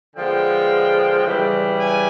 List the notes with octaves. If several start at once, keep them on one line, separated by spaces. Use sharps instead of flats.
D3 F3 G#3 B3 G5
C#3 E3 G3
G#5